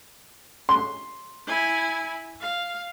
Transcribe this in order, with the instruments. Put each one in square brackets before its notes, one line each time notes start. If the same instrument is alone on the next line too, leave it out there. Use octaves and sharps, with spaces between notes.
[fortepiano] C6
[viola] E4 G#5
F5